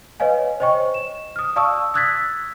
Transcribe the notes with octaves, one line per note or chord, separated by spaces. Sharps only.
B4 C#5 D#5 F5 G#5
C5 C#5 D#5 G5 C#6
E7
D#6 F6
D5 F5 A5 C#6 D#6 E6
D#6 E6 F#6 G#6 A6 B6